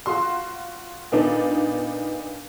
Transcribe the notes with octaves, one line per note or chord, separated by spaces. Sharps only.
F4 F#4 C6
A#2 B3 D4 D#4